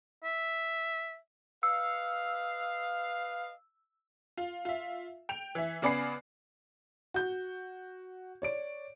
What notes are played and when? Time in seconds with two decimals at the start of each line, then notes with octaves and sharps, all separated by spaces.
0.24 E5
1.63 B4 D#5 F5 E6
4.37 F4
4.65 F4 E5
5.29 G5 F7
5.55 E3 E5
5.82 C#3 B3 D5 G#5 B5 C7
7.14 F#4 G6
8.42 C#5 D5 D7